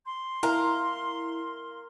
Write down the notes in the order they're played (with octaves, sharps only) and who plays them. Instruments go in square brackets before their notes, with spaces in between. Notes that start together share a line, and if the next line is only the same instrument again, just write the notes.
[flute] C6
[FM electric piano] E4 [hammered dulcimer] A#4 [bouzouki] F5 A#5